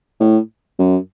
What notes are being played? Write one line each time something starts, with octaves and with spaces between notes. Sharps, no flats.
A2
F#2